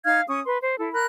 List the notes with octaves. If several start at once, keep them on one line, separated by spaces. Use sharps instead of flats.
D#4 F5 F6 G#6
C#4 C#6 D#6
B4 C6
C5
E4 A4
A#4 B5 F#6